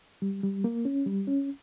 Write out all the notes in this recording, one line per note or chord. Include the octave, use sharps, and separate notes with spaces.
G3
G3
A#3
C#4
G3
C#4